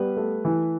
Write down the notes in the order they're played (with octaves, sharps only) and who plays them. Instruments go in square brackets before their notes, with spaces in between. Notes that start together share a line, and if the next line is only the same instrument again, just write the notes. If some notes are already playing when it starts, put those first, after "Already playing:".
Already playing: [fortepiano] G3 B3 B4
A3
E3